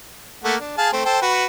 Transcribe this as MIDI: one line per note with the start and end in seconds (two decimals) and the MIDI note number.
0.44 0.55 57
0.44 0.55 58
0.44 0.55 78
0.60 0.75 62
0.78 0.89 68
0.78 0.89 77
0.78 0.89 81
0.93 1.03 57
0.93 1.03 60
1.05 1.21 69
1.05 1.21 72
1.05 1.21 79
1.22 1.46 66
1.22 1.46 71